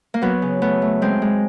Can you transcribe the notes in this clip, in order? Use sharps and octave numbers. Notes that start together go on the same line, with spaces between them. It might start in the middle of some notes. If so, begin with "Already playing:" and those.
A#3
F#3 B3
C#3
A3 B3
A3
G#3 C4
G#3